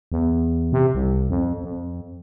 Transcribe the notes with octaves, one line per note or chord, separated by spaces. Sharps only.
E2
C3
C2
F2
F2